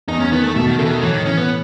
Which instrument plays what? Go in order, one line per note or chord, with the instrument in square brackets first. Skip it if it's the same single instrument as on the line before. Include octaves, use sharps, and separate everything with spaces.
[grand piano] E2 [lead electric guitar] D#4
[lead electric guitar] C#4
[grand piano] D#3 [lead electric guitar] B3
[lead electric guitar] A3
[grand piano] B2 [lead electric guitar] A3
[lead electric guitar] D#3
[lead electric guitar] C#3 [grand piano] A3
[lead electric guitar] E3
D#3
[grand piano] A2 [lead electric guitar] E3
[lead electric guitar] D#3
[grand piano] E3 [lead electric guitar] C#4
[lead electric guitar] B3